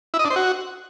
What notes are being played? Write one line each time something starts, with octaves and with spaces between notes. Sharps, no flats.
E4
D#5
D4
C5
F#4